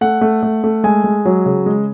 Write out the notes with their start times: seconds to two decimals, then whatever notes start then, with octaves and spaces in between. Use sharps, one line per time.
0.01 A3 F#5
0.21 A3
0.43 A3
0.64 A3
0.84 G#3 G#5
1.04 G#3
1.25 F#3
1.46 C#3
1.66 G#3